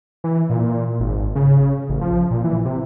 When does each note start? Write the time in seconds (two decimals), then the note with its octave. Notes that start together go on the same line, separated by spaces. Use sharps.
0.24 E3
0.50 A#2
1.00 G#1
1.35 C#3
1.89 A1
2.01 F3
2.31 A#2
2.44 E3
2.65 C3